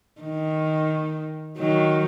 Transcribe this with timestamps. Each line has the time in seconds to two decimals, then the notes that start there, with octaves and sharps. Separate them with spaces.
0.21 D#3
1.58 D#3 F#3